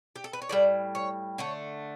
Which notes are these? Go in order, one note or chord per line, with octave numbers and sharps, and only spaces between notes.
G4
A4
B4
C#5
A2 G3 D5
C#5
D3 A3 C#5